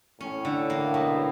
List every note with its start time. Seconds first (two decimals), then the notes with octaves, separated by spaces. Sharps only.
0.20 A2 C#4
0.45 D3
0.70 A#3
0.94 B2